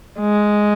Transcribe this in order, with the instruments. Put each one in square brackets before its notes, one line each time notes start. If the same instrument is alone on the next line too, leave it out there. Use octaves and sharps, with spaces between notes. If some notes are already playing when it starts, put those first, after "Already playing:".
[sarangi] G#3